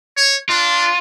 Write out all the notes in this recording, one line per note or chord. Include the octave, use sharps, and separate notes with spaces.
C#5
D4 F4